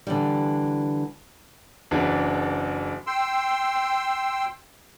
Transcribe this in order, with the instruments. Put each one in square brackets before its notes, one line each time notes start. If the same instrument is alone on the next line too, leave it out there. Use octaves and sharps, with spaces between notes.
[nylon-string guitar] D3 E3 G3
[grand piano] F#1 C#3 E3 F#3 D4
[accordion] G5 C6 E6